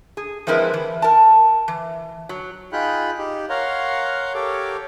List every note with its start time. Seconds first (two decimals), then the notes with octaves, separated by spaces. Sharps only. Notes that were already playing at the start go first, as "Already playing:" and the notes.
0.17 G#4
0.47 F3 G#3 C4 E4 A#4 B4
0.74 E3
1.02 A#4 A5
1.68 E3
2.29 F#3
2.72 D#4 F4 G#4 G5 B5 F#6
3.18 D#4 G4
3.50 A#4 C#5 F5 F#5 A#5 C6
4.34 G4 A4 A#4 C#5 D6